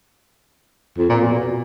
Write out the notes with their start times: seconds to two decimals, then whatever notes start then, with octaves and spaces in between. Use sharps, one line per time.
0.98 F2
1.10 A#2
1.21 B2